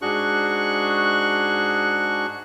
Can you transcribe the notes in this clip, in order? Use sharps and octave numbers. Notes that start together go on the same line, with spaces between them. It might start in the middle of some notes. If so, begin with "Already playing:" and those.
G#2 D4 F#4 G#4 C#6 F#6